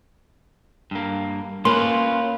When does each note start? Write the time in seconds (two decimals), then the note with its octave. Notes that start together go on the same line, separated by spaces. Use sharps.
0.91 G2 A#3
1.65 A#3 C#4 F4 B4 C6